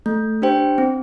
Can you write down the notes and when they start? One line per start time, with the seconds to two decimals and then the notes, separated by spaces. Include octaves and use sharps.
0.06 A3
0.42 D4 G4 C5 G5
0.78 C4